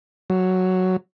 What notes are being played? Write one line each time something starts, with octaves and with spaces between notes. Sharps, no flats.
F#3